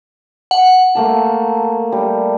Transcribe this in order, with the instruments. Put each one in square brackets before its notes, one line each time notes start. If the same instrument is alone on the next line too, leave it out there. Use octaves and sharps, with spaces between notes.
[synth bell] F#5
[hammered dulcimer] A3 A#3 A5
G3